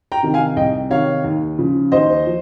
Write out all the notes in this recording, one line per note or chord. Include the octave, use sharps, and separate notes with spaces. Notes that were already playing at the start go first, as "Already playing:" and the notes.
G5 A#5
C3 D#3
F5 G#5
C2 D#5 G5
C3 D#3 C#5 F5
D#2
C#3 F3
D#2 C5 D#5
F3